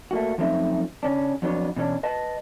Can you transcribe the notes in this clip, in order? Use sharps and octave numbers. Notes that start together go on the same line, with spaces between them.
A3 A#3 F#4
F#2 F3 A3 C4 D#4 E5
C#3 C#4 D4
F2 F#3 B3 D4 C#5
B2 E3 C#4 D4
B4 D#5 A5